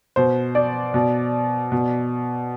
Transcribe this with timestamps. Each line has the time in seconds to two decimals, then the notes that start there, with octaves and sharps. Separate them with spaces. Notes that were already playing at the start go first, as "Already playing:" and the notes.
0.16 B2 C5
0.55 D5
0.94 B2
1.72 B2